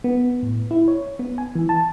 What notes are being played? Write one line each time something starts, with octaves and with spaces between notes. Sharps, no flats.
B3
A2
E4
C#5
B3
G#5
E3
A5